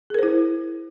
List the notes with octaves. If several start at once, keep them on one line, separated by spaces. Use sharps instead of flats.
E4 G#4 A#4 C5